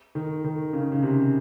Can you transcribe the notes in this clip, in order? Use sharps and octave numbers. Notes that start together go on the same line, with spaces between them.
D#3
D#3
C#3
C#3
C3